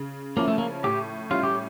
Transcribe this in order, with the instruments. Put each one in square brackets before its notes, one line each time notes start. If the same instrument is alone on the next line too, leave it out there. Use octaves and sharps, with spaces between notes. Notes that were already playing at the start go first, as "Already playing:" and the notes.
Already playing: [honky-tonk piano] C#3
[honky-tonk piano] F3 C#4 E4 [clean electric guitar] A#3
[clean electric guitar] A3
A#3
[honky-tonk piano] A2 [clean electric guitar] G4
[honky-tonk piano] G3 C#4 E4 [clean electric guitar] F4
[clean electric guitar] G4